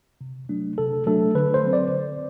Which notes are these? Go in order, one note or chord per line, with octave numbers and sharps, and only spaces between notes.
C3
F#3 A3 D4
C3 A4
F#3 A3 D4 A4
D3 B4
C5
F#3 C4
D5
D3